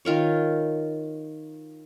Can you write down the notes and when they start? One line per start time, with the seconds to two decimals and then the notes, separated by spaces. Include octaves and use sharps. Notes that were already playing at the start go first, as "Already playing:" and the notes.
0.05 D#3 F4 A#4 C#5